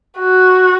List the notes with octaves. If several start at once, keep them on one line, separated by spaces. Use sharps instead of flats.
F#4